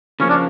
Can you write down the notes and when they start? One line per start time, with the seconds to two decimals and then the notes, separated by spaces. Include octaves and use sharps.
0.20 C#3 F3 A#3 C#4
0.30 D4